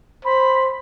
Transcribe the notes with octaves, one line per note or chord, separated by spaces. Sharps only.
C5 B5